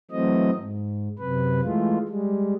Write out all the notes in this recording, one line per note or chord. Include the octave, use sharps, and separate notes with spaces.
E3 F#3 A3 C4 D#5
G#2
F#2 C3 B4
E3 G#3 A3 F4
G3 G#3